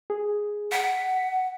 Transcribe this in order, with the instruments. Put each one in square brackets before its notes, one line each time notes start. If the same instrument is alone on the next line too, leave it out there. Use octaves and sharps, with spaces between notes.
[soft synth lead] G#4
[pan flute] F#5 [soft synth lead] B6